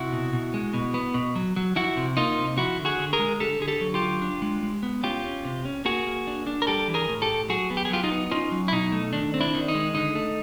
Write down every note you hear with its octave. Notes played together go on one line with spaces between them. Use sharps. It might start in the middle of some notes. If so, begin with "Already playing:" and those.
Already playing: C3 E4 F#4
B2
B2
G#3
B2
B3
B2
F#3
F#3
F3 E4 F#4
C3
A#3 D#4 F4
C3
F3 E4 F#4
D3
F#4 G#4
D3
G#4 A#4
G#3
D3 G4 A4
D3 G#4
G4 A4
F#3
F4 G4
D3
D4
G#3
G#3
B3
C#4 F4 G4
C#4
C3
C#4
A#3 F#4 G#4
A#3
D4
D4
A#4
G3 G4 A4
E3
G#4 A#4
A2
G4 A4
A2
F#3 F#4 G#4
B3
G4
G#4
F#3 F4 G4
D#4 F4
B3
C#4 D#4 F4
F#3
E4
B2 D#4
A3
D#3 D4
C4
D4 E4
D#3
D#4
G#3
D3 D#4
A3